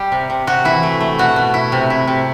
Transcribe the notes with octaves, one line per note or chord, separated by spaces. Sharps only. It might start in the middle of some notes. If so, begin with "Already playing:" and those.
Already playing: G3 G4
C3
C3
C3 F#4
E3 E4
A3
A3
B2 F#4
B2
E4
C3
E4
C3